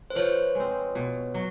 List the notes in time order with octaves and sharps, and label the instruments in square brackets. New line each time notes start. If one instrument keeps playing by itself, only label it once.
[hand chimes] C5
[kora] F3 [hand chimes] B4 C#5
[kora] G#3 C4
B2
F#3